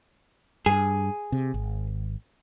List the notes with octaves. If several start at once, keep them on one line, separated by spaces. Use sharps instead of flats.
G2 G#4
C3
G#1